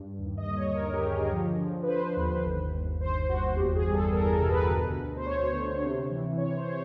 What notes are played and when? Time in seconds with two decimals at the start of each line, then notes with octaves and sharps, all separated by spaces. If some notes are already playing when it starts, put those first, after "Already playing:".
Already playing: G2
0.19 D#2
0.37 D#5
0.47 D3
0.57 C#5
0.75 D#2 A#4
0.93 G4
1.03 D3 G#4
1.32 F3
1.60 F3
1.83 B4
1.88 D3 C5
2.17 D#2
2.44 G1
2.72 G1
3.01 G1 C5
3.29 G1 F#4
3.56 E2 G4
3.75 G#4
3.86 G3
3.94 A4
4.12 E2 A#4
4.32 A4
4.41 B2
4.51 B4
4.69 D2
4.97 D2
5.17 C5
5.26 D2 C#5
5.53 D3
5.82 C3
6.11 E3
6.38 C3 C#5
6.57 C5
6.66 E3 C#5